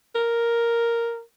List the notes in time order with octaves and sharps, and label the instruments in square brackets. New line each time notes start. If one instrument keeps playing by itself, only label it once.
[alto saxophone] A#4